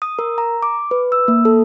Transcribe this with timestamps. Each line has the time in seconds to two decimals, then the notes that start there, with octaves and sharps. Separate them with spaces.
0.02 D#6
0.19 A#4
0.38 A#5
0.63 D6
0.91 B4
1.12 E6
1.28 A#3
1.45 A4